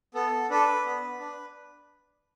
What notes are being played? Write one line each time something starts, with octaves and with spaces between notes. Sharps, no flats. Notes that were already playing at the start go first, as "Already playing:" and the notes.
B3 A4
D4 A4 B4
B3
D4